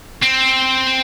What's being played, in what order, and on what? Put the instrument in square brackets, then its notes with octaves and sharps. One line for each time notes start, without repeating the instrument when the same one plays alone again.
[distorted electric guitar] C4